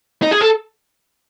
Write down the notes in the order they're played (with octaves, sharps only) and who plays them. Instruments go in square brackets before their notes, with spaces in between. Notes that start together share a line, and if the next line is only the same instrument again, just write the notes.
[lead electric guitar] D#4
G#4
A4